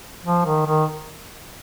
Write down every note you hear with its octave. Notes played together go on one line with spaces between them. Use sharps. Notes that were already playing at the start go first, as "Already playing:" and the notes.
F3
D#3
D#3